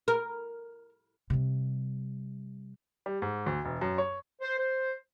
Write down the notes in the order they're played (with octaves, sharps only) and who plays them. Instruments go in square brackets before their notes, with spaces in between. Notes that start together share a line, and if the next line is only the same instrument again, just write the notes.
[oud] A#4
[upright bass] C3 G3
[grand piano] G3
G#2
D2
E1
F#2
C#5
[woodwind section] C5
C5